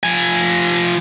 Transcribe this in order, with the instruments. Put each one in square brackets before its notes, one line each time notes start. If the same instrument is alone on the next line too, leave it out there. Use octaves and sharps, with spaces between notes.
[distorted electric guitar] F3 G#5